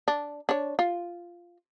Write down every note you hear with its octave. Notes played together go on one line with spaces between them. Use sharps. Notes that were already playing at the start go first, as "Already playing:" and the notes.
D4
D4 C#5
F4